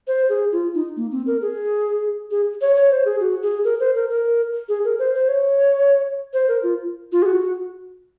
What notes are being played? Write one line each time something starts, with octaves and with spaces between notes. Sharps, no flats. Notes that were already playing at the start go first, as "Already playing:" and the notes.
C5
G#4
F4
D#4
A#3
C4
A#4
G#4
G#4
C#5
C#5
C5
G#4
F#4
G#4
A#4
C5
A#4
A#4
G#4
A#4
C5
C5
C#5
C5
A#4
F4
F4
G#4
F#4